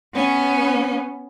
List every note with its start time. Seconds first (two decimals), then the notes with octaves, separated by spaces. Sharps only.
0.14 B3 C#4